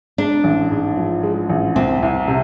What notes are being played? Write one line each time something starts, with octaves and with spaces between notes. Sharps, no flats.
G#3 D4
A1
G#2
F3
G#3
A1
C2 C4
C2
C3